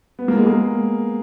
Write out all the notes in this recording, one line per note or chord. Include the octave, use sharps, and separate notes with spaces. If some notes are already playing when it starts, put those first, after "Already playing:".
B3
A#3
G#3
A#3